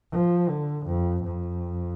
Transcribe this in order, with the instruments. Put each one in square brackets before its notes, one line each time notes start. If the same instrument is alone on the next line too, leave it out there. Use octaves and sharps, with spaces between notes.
[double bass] F3
D3
F2
F2